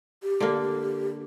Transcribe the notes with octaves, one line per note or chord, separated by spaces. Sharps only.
G4
D3 A#3